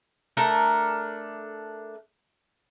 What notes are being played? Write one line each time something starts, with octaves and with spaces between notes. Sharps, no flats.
A3 D4 A#4